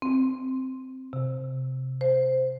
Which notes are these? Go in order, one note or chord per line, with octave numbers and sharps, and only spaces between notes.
C4
C3
C5